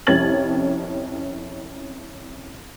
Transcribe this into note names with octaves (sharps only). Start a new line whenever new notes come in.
C2 F2 C#4 G#6 A6 F#7